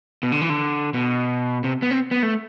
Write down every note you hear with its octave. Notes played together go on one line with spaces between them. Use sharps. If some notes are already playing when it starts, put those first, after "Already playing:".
B2
D3
E3
D3
B2
C3
B3
C4
B3
A3